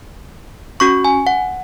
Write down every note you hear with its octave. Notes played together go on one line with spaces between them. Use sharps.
C#4 F#4 C#6
G#5
F#5